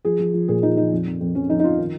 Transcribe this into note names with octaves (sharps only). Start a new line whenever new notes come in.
F3 G#4
F3
F3
A#2 G#4
F3 D#4
F3 D#4
F2
F2
F2
F2 C#4
F2 D#4
D#4
F3 F4
D#3